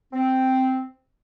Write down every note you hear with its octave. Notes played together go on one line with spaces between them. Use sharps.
C4